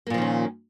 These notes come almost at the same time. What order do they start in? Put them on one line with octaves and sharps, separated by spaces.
A#3 A#2 F3 D#3 C#4